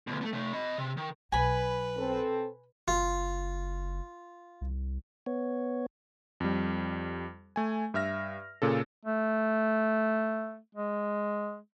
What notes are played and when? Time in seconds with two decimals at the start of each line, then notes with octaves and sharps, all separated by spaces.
0.07 D2 B2
0.21 A3 B3
0.33 C3 A3
0.53 D#5 B5
0.78 C3
0.97 D#3
1.32 B1 B4 G#5 B5
1.98 C4 A4
2.88 F#1 F4
4.61 C2
5.26 B3 C#5
6.40 F2 G3
7.56 A3 G#5
7.94 G2 E5 F6 A#6
8.62 A#2 C#3 A4
9.05 A3
10.75 G#3